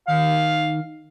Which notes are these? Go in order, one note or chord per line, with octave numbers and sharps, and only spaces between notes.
D#3 F5